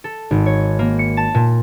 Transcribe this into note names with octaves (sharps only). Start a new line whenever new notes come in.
A4
G#1
C#5
A#3
C#7
A5
A#2